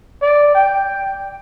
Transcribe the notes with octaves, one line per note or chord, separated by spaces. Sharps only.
D5
G5